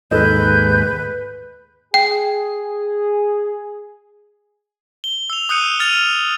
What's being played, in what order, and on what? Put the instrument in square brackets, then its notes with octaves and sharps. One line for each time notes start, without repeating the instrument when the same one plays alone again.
[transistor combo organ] D#2 G#2 [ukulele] A4 D#5 [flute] B4 [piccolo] G6
[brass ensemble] G#4 [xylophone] G5
[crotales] G7
E6 F7
D#6 E6 F#6 G6 C#7 D#7
F6 A6 D#7 F7